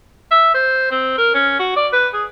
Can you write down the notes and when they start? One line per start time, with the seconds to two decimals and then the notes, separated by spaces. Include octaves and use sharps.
0.31 E5
0.55 C5
0.91 C4
1.18 A#4
1.34 C#4
1.59 F#4
1.76 D5
1.93 B4
2.14 G#4